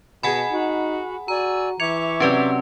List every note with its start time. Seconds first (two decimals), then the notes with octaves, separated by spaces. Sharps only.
0.23 B2 G#4 D#5 F#5 G#5 A5 B5
0.52 D#4 F#4
1.28 F#4 D5 G#5 A#5 E6
1.80 E3 E5 C#6 D6 G#6 C#7 F7
2.20 C3 F#3 C4 C#4 B4 D5